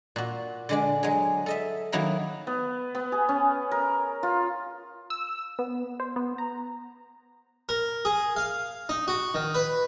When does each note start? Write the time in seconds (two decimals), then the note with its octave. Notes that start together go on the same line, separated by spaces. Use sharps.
0.16 A#2 F#4
0.69 D3 G#3 D4
1.03 F#3 G#3
1.46 A4 D#5 E5
1.92 D#3 F#3 A#3 E4 A#4
2.47 B3
2.95 B3
3.12 G#4
3.29 C#4
3.71 A#4
4.23 F4
5.10 E6
5.59 B3
6.00 C5
6.16 B3
6.38 A#5
7.69 A#4
8.05 G#4
8.36 F5
8.89 D#4
9.08 F#4
9.34 D#3
9.54 B4